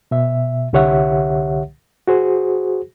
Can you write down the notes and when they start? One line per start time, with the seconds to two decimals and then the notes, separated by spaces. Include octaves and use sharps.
0.11 B2 E5
0.73 C2 D3 G4 C#5 E5 F#5
2.08 F#4 G#4 C5